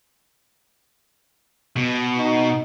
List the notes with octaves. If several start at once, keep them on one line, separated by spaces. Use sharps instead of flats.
B2
D#4